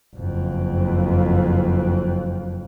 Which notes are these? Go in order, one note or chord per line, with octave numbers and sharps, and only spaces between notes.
F#1 F2